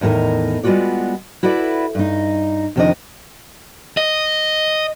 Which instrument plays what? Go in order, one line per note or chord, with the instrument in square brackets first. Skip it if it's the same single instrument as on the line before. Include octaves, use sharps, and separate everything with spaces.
[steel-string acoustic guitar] E2 A2 D#3 A#4 D#5
G3 G#3 B3 F4 F#4 D5
E4 F#4 A4 B4 D5 E5
G2 D#4
F2 C3 D#3 F3 D4 D#5
[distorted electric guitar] D#5